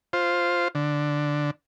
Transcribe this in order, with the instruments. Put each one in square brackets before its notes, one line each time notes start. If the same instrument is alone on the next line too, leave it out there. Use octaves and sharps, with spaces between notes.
[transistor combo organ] F4 C5
D3